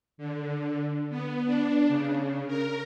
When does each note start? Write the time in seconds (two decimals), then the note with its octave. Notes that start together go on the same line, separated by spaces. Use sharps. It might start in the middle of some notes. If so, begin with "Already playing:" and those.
0.18 D3
1.10 B3
1.45 D4
1.88 C#3
2.47 A#4